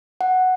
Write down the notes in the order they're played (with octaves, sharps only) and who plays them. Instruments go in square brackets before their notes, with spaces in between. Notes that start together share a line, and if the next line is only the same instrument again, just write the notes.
[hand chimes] F#5